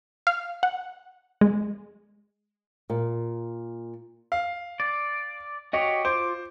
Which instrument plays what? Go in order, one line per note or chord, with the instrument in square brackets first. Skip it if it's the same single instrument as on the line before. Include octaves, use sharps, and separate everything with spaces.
[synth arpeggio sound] F5
F#5
G#3
[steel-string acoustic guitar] A#2
[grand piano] F5
[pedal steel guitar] D5
[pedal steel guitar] F#4 G4 C#5 [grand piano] D#5
[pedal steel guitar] F4 D6 [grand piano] C5